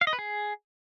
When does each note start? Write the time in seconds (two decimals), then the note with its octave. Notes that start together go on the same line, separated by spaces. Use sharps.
0.01 F5
0.07 D#5
0.13 B4
0.19 G#4